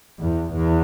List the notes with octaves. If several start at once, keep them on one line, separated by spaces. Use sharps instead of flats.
E2
E2